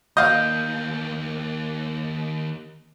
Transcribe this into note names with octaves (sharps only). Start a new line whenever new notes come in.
D#2 A#3 D#5 F5 G6